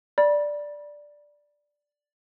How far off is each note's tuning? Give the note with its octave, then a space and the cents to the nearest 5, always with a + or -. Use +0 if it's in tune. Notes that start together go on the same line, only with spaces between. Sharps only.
D5 +0 B5 -35